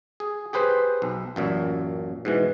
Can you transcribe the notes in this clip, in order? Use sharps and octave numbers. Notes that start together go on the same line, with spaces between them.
G#4
G4 G#4 B4 C5
B1
A1 F#2 A#2
G#2 B2 E3